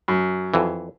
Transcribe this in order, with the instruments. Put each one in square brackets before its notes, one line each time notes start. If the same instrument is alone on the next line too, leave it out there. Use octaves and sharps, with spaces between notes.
[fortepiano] F#2
[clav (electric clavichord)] F2 E3